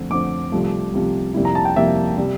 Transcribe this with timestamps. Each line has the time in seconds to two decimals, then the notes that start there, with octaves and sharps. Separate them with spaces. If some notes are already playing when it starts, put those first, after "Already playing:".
Already playing: F2 D3 A3 C4
0.10 F2 D3 A3 C4 D6
0.52 C2 C3 F3 A3
0.93 C2 C3 F3 A3
1.34 F2 C3 G3 A#3 E4
1.45 A#5
1.55 A5
1.65 G5
1.76 F2 C3 G3 A#3 E4 E5
2.17 C3 G3